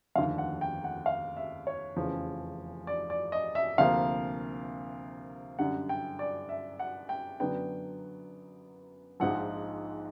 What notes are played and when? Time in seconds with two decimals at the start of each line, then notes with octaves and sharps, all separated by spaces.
0.16 F1 D#2 D3 F3 F5
0.38 F#5
0.61 G5
0.84 F#5
1.06 F5
1.37 E5
1.67 C#5
1.97 F1 E2 C#3 F3
2.87 D5
3.10 D5
3.32 D#5
3.55 E5
3.78 D2 C3 F3 A#3 F5
5.58 F#2 D3 G3 F#5
5.89 G5
6.19 D5
6.49 E5
6.79 F#5
7.09 G5
7.40 F#2 D3 F#3 B3 D4 G5
9.20 A#1 G#2 F3 F#5